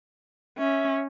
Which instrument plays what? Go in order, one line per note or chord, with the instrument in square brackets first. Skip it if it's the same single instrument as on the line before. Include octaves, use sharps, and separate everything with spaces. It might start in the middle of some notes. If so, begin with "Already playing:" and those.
[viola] C#4 [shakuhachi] E5